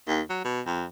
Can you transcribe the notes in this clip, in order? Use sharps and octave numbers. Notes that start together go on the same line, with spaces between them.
D#2
F#3
B2
F2